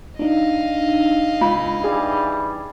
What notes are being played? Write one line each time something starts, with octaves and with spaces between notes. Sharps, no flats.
D4 D#4 D#5 F5
C#2 B5
E3 G3 G#4